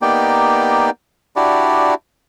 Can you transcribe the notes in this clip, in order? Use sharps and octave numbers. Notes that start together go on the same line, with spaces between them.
A#3 B3 D#4 G4 D5 G5
D4 E4 F#4 G4 D5